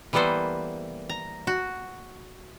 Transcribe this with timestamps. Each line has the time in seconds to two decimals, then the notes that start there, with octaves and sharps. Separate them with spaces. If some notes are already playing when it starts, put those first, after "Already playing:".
0.13 E3 G3 A#3 B3 A4 C5
1.09 A#5
1.47 F#4